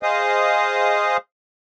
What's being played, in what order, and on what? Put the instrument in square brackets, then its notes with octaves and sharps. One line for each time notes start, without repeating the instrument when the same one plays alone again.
[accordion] G#4 C5 D#5 F5 D#6